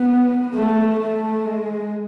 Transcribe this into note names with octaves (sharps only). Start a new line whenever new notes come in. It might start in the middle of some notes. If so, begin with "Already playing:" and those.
Already playing: B3
A3
A3
G#3